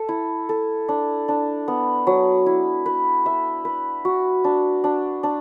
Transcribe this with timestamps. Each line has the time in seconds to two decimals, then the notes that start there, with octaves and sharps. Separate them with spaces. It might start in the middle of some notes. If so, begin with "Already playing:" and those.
Already playing: A4
0.09 E4
0.49 A4
0.89 D4
1.28 D4
1.68 B3
2.07 F#3
2.46 E4
2.86 B4
3.26 E5
3.65 B4
4.05 F#4
4.44 D4
4.84 D4
5.23 D4